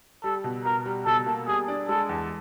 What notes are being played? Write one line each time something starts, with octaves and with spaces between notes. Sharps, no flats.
G3 A4
B2
B2 A#4
G3
B2 A4
A#3
G3 G#4
D4
G#3 A4
E2